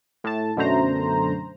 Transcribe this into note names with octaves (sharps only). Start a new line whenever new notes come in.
A2 A5
F#2 B2 D3 A3 C5 A#5